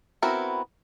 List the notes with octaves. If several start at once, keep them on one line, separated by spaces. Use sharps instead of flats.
B3 C4 E4 F#4 A#4